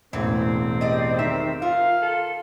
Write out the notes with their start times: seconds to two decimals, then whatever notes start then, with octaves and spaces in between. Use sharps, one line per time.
0.13 E1 A1 A2 E3 C4
0.81 G4 D5 D#5
1.19 D#3 E5
1.62 F4 A#4 F5
2.02 A4